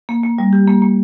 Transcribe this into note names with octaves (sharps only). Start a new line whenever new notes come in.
A#3
A#3
G3
G4
A#3
A#3